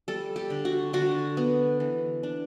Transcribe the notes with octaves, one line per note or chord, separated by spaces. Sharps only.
G3 A4
G4
D3
F#4
D3 F#4
B3
E3
D4